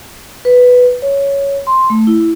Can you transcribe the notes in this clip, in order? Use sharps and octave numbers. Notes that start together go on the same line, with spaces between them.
B4
C#5
C6
A3
E4